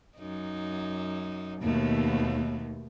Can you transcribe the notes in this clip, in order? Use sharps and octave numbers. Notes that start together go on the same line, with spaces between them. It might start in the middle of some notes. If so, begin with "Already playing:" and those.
F#2 D#4
D#2 B2 A3 B3